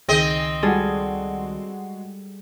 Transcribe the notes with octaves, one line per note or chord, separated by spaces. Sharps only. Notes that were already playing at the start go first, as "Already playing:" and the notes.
C#2 D#3 C4 G#4 D#5
G3 G#3 F#4 G#4 A4